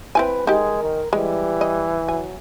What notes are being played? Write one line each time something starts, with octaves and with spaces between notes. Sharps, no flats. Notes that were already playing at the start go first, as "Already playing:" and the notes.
C4 E4 B4 G#5
G#3 D#4 G4 A#4
D#3
E3 G3 G#3
D#5
F#3 G#5